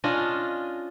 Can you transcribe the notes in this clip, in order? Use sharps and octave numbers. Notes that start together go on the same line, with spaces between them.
C#4 D4 F4 D#5